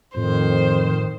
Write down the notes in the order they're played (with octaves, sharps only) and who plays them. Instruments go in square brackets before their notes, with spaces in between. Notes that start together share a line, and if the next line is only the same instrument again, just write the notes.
[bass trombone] F2 [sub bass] A2 [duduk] D#3 [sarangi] C5